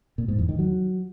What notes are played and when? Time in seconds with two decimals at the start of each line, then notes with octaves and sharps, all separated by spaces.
0.18 A#2
0.28 G#2
0.38 E2
0.49 D#3
0.59 F#3